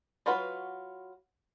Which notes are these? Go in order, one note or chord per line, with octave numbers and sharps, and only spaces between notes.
F#3 F4 F#4 B4